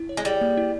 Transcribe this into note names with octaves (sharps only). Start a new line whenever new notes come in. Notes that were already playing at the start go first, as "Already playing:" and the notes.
Already playing: E4
C#5
G#3
G3 G#4
A#3
E4